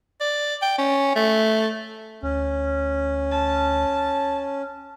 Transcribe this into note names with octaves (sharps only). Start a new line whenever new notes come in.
D5
G5
C#4
A3
D2 C#4
A5